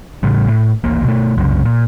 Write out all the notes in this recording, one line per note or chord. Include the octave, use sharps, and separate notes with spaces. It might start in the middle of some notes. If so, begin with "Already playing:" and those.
A2 C#3 G3
A2
D1 A1 A#3
B2 A3
C2 F#2 C#3
A#2